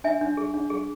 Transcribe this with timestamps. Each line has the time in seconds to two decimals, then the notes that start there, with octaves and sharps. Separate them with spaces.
0.04 D4 E5 G#5
0.21 D4
0.37 G#4
0.54 D4
0.70 G#4